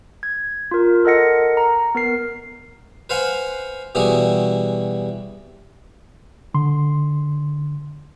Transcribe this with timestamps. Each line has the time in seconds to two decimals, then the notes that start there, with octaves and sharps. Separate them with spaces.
0.23 G#6
0.71 F4 A#4
1.05 A4 A#4 D#5 F#5 A#6 C#7
1.57 A#5
1.95 B3 A#4 C7
3.10 B4 C5 F5 F#5 G#5
3.95 B2 E3 G3 F#4 G#4
6.54 D3 C6